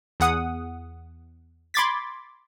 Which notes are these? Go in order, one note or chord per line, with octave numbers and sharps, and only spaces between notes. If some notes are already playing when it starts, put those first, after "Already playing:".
E2 G#4 F#5 D#6
B5 C6 D6 G#6 A6 B6